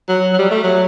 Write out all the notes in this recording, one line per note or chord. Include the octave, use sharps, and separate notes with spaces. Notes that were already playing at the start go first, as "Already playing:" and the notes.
F#3
F#3
G3
A3
F#3